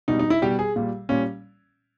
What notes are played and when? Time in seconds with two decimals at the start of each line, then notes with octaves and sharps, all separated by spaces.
0.08 B2 G3 D#4
0.19 D#4
0.30 E4
0.42 B2 G3 G4
0.59 G#4
0.76 A#2 G3
1.09 A#2 G3 C#4